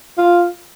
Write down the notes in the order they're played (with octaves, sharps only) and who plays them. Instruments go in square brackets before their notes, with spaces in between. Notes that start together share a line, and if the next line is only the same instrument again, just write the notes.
[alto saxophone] F4